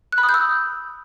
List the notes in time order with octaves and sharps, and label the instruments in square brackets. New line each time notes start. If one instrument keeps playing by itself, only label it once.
[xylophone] F#6
B5
D#6
G6
E6